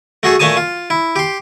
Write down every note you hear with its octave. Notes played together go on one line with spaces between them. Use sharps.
A3 F#4 G#4 A4
A#2 A3 C#5 G#5 A5 D#6
F4
E4
G4 C6